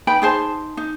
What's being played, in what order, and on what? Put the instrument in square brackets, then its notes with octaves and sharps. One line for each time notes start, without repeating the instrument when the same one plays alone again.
[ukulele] D#4 B4 G5 B5
D#4 G#4 C5 A5
D#4